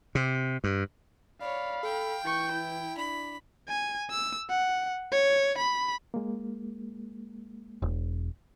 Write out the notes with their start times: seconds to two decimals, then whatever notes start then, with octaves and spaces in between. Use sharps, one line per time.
0.15 C3
0.64 G2
1.41 C#5 D5 F5 B5
1.83 A4 G5
2.25 E3 C#6 G6
2.53 E4
2.97 D4 B5
3.69 G#5
4.11 E6
4.50 F#5
5.12 C#5
5.58 B5
6.14 G#3 A#3
7.82 E1